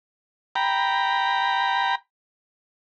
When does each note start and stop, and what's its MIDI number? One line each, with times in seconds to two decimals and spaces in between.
0.56 1.95 79
0.56 1.95 82
0.56 1.95 83